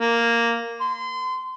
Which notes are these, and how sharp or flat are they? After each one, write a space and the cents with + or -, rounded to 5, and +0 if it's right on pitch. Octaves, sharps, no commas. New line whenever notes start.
A#3 -5
C6 -30